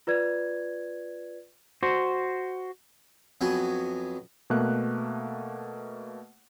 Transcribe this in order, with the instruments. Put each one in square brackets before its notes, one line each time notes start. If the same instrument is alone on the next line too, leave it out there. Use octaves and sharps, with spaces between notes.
[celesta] F4 B4 D5 G#6
[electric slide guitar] F#4 C5
[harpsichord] F2 F#3 B3 F#4 G#5
[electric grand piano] B2 A3 A#3 F#6